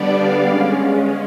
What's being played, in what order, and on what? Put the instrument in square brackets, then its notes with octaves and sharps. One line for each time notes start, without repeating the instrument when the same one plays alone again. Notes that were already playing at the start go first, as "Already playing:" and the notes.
Already playing: [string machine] D3 G3 B3 D4 D5
F5
G#3 C#4